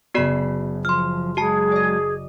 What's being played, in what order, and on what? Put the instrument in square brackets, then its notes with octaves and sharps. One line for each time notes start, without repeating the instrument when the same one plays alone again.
[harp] F#1 B5 C7 [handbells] B3 F#4 D5
[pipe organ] F3 [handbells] C6 F6
[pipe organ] F#3 G#3 [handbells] F#4 A5 [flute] G#4
[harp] D5 D#5